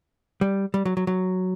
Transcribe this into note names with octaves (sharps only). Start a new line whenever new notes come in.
G3
G3
F#3
F#3
F#3